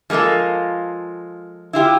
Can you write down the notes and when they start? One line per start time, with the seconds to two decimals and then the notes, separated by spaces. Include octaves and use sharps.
0.10 F3 G#3 A#3 F4 A4
1.73 E4 F4 G4